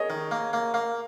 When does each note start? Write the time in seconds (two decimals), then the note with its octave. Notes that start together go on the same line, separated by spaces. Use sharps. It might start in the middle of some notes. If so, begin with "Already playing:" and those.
Already playing: G#4 A#4 C#5 D#5
0.10 D#3
0.31 A#3
0.53 A#3
0.74 A#3 F5